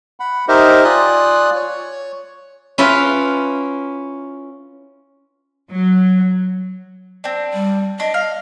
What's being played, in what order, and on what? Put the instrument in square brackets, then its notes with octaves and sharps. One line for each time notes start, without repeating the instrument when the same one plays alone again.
[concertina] F#5 B5
D#4 G4 A#4 C5 D#5 E5
F4 D5 G#5 D#6 F#6
C#5
[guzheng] C#4 E4 F4 B4
[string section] F#3
[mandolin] C4 D4
[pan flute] G3
[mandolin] D4 [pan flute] D#5
[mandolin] F5